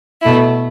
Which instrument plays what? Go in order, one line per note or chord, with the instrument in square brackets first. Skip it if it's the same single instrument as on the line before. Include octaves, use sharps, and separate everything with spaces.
[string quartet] B2 A3 E4